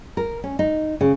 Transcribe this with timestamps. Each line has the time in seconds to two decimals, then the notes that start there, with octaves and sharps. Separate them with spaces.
0.17 A#4
0.44 C#4
0.59 D#4
1.01 C#3